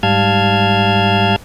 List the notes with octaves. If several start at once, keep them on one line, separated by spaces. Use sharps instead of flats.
G#2 G3 F5 A5 F6 G#6